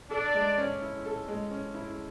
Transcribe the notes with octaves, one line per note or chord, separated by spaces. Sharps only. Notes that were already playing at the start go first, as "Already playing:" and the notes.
D4 A4 D5
G#3
C#4
E4
A4
G#3
C#4
E4